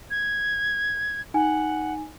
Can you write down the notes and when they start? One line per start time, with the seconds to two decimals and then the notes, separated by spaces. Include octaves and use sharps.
0.11 G#6
1.34 D#4 F#5 G#5